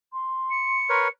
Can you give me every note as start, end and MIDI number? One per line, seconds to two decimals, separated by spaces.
0.13 1.06 84
0.51 1.09 97
0.89 1.08 70
0.89 1.08 71
0.89 1.08 73